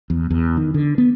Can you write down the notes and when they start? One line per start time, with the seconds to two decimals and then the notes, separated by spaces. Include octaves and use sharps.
0.10 E2
0.30 E2
0.57 D#3
0.74 D3
0.98 B3